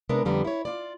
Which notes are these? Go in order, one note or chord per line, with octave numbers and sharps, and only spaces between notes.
C3 G#3 B3 D4 A#4
F2 D3 G3 B3 A#5
E4 C#5
F4 D5